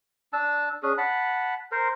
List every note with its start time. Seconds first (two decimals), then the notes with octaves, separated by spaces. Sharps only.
0.33 D4 A5 E6
0.83 C#4 D4 G#4
0.98 F#5 A5 B5
1.72 A#4 C5